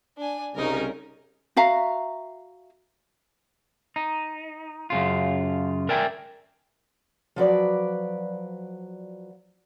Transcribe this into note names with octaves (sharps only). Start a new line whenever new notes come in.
D4 G#5
C2 C#3 D#4 A#4
F#4 E5 F5 A#5
D#4
F#2 C#3 F4
A#4 D5 E5 G5 G#5
F3 F#3 B4 D5